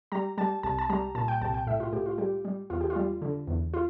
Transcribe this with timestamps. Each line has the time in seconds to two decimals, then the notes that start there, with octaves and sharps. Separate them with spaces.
0.12 G3 A#5
0.38 G3 A5
0.63 C2 A5
0.79 A5
0.90 G3 A#5
1.15 A#2 A5
1.28 G5
1.42 C2 A5
1.54 G5
1.66 A2 E5
1.80 F4
1.92 A2 G4
2.06 F4
2.18 G3 G4
2.45 G3
2.70 E2 F4
2.81 G4
2.90 F4
2.96 G3
3.22 D3
3.48 E2
3.74 F4